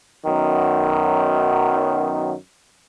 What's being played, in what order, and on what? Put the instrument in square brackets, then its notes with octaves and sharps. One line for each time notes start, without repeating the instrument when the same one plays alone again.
[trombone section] F#2 D#3 F#3 B3 D#4